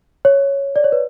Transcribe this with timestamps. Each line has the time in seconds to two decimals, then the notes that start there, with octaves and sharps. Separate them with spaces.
0.25 C#5
0.76 D5
0.84 C#5
0.92 B4